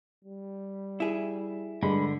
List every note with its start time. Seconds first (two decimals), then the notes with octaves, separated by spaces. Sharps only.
0.24 G3
1.00 E4 G#4
1.83 G2 D3 G#3 B5